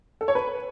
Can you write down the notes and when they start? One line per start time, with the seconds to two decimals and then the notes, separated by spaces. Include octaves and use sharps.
0.21 A4
0.28 C#5
0.35 B4